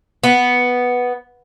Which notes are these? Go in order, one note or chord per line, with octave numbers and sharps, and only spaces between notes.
B3